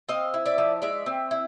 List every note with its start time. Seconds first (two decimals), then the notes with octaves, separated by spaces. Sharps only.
0.08 C4 D#5 F5
0.34 E4
0.46 D5 E5
0.58 F3
0.82 G#3 D5 E5
1.06 C4
1.31 E4